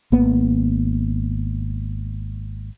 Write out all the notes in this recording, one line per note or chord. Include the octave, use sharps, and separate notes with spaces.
G#1 A#3 B3